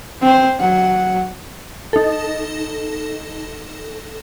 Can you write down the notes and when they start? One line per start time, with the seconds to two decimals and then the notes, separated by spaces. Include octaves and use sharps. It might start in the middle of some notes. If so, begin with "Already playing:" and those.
0.22 C4 C5
0.60 F#3 F#5
1.93 D#4 A4